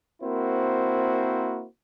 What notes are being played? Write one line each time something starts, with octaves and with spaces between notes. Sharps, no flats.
A#3 C4 E4 F#4 A#4 C5